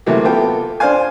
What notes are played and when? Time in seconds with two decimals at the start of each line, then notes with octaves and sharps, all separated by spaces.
0.06 C3 E3 F#3 A3 A#3
0.25 B3 F4 A4 G5
0.80 D4 C5 D5 F5 G#5